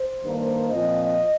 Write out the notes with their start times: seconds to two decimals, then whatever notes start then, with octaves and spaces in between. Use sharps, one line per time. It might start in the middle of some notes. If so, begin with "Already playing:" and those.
Already playing: C5
0.23 G2 D#3 A#3 D4
0.70 A#2 F3 C4 D#5